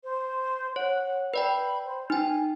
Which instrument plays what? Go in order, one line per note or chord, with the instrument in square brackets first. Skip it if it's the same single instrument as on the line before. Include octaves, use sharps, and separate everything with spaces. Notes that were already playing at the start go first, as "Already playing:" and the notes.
[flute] C5
[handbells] C#5 [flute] F#5
[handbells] B4 D5 G5 [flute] B5
[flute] C5
[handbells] D#4 G5 [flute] G#5